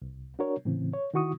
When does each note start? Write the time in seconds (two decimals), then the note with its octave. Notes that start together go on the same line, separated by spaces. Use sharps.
0.02 C2
0.39 D4 F#4 A#4 C#5
0.65 A2 C#3 E3 C4
0.94 C#5
1.14 D#3 E4 F#4 C#6 D#6